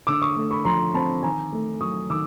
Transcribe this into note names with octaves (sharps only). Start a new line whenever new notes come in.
D3 D6 E6
C#6 D#6
A3
B5 C#6
F3 A#5 C6
C4 A5 B5
D#3 G#5 A#5
A3
F#3 C#6 D#6
D#3 D6 E6